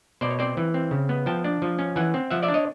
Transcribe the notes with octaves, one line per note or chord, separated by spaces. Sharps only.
B2 C5 D5
C#5
C4 C5 D5
E3
C4
C#3
B3
F3 G5 A5
D4
F3
C#4
E3 F#5 G#5
C4
F3 E5 F#5
D5 E5
D4
C#5 D#5